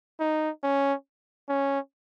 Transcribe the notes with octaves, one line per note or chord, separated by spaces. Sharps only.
D#4
C#4
C#4